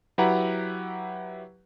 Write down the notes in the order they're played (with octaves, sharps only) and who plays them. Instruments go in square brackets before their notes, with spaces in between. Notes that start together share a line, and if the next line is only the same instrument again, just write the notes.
[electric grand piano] F#3 E4 G4 B4 F#5 A#5